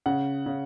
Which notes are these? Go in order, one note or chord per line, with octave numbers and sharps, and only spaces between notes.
C#3 F#5
C#3